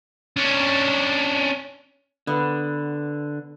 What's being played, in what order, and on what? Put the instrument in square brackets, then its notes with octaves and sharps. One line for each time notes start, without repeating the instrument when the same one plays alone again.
[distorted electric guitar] C#4 D4
[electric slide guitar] D3 [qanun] B3